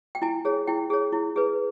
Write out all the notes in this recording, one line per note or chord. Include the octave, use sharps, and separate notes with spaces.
G5
E4 G#5
G#4 C#5
E4 G5
G#4 C#5
E4
G#4 B4